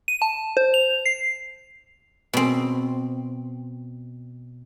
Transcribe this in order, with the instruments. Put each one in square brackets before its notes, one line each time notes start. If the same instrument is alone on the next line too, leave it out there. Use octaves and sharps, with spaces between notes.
[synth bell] D#7
A5
C5
F7
C7
[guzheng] B2 C4